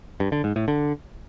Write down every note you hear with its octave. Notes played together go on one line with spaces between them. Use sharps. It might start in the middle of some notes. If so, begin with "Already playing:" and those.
G2
D3
G#2
A2
D3